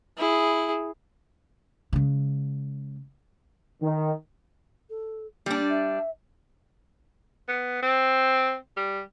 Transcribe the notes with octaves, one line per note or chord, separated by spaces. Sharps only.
E4 G#4
C#3 G#3
D#3
A4
G3 A#3 D4
E5
B3
C4
G3